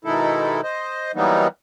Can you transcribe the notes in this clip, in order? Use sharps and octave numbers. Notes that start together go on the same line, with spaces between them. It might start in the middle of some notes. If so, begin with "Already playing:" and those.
B2 D#3 G#3 D#4 E4 A4
C5 D#5
E3 F#3 G3 A#3 B3 D#4